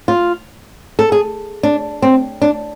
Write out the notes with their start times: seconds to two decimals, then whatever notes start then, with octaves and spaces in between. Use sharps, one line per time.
0.08 F4
0.99 A4
1.12 G#4
1.63 D4
2.02 C4
2.42 D4